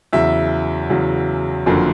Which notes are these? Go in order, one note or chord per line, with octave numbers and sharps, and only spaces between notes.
E2 C#3 F#3 E5
E2 C#3 F#3
F#1 F2 D3 F#3 A#3